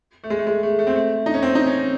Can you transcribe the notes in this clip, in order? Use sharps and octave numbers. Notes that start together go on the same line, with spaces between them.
A3
G#3
A3
G#3
A3
A3
C4
A3
D#4
C#4
C4
D#4
C#4